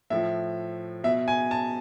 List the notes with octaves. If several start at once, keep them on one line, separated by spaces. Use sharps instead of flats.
A2 F3 E5
B2 E5
G#5
A5